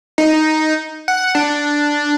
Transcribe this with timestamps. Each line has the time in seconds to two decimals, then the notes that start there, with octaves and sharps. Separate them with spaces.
0.18 D#4
1.08 F#5
1.35 D4